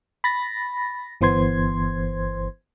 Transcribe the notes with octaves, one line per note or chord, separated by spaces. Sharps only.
B5 A6 A#6
G1 E3 B3 C5 C6 G#6